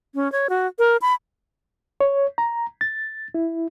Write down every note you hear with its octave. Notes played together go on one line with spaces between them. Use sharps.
C#4
C#5
F#4
A#4
B5
C#5
A#5
A6
E4